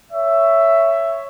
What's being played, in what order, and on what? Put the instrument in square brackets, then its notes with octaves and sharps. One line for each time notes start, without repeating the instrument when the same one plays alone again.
[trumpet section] C#5 E5